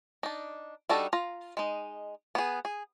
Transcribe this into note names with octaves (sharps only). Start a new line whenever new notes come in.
D4 D#4
G3 D4 D#4 F#4 A4
F4 A#5
G#3 D#4
B3 G#4
G#4